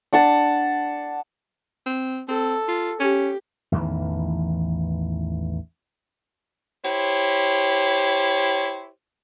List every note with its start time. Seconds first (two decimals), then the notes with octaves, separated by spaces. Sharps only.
0.13 D4 F#5 A5
1.86 C4
2.29 C4 A4
2.68 F4
3.00 C#4 G4
3.72 A1 E2 D#3 E3
6.84 E4 G4 C5 C#5